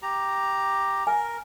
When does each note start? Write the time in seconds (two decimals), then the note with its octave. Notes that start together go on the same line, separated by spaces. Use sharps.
0.02 G4 A#5
1.07 A#4 G#5